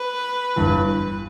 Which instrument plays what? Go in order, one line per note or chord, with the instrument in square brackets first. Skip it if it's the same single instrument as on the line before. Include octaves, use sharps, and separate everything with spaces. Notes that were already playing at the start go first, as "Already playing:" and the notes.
Already playing: [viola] B4
[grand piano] G1 G2 E3